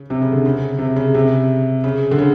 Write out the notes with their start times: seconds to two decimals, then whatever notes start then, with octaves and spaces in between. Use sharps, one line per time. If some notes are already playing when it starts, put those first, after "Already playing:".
Already playing: C#3
0.10 C3
0.22 C#3
0.32 D3
0.45 C#3
0.79 C3
0.96 C#3
1.14 C3
1.84 C#3
2.11 D3
2.18 C#3